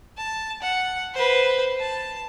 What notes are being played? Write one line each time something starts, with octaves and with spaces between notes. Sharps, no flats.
A5
F#5
B4 C5
A5